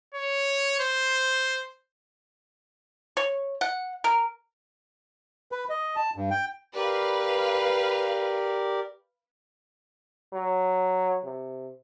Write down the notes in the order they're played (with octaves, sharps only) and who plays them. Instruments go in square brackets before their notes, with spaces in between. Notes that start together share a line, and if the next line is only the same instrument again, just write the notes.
[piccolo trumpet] C#5
C5
[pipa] C#5
F#5
A#4
[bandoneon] B4
D#5
A5
G2
G5
[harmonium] G4 A#4 D5 [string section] B4 F5
[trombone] F#3
C3